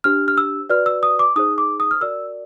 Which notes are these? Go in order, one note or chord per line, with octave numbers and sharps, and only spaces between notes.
D4 G4 C5 F6
F6
E6
F#4 B4 D5 F6
E6
D#6
D6
D#4 G#4 C5 D#6
D6
D#6
F6
F#4 A#4 D5 E6